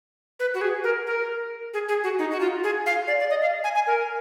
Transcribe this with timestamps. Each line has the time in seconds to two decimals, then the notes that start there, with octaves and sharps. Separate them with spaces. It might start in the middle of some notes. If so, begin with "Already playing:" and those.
0.40 B4
0.54 F#4
0.61 G#4
0.84 A#4
1.07 A#4
1.74 G#4
1.89 G#4
2.04 F#4
2.19 D#4
2.31 F#4
2.40 F4
2.64 G#4
2.86 F5
3.07 D5
3.20 D5
3.30 D#5
3.42 F5
3.64 G#5
3.75 G#5
3.87 A#4